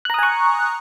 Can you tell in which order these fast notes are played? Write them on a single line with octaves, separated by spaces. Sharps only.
F#6 A#5 D#6 G#5 C#6